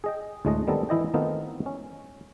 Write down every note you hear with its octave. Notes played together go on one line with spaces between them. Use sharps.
G#4 D#5 G5
D2 A2 G#3 A3 D#5
D#3 G3 B3 C4 A4 A#5
E3 E4 D#5 G5
D#3 A3 B3 C4 D#4 F4
C#4